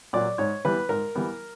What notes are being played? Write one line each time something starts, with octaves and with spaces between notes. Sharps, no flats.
A#2 F#3 D5
G#2 C#5
E3 G3 B3 B4
G#2 A#4
E3 G3 B3